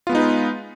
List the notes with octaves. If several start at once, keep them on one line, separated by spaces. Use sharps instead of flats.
G#3 B3 D#4 F4 B4